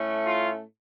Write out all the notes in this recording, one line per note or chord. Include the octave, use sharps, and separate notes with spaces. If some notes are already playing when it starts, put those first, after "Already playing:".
Already playing: A2 A3 C#4
F4